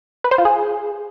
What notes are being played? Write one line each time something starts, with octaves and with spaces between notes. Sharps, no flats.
B4
C5
F4
G#4